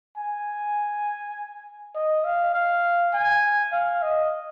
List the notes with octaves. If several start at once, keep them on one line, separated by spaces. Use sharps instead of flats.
G#5
D#5
F5
F5
G#5
F5
D#5